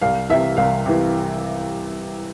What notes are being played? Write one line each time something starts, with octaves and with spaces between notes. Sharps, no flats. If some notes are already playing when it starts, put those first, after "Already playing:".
C2 F5
C3 E3 E5
C2 F5
C3 E3